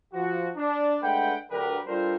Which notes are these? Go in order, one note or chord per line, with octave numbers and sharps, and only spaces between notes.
F3 F#4
D4
G#3 A3 D4 B4 F#5 G5
D2 D3 F#3 G4 A#4 B4
G3 D4 F4 A4 A#4 C5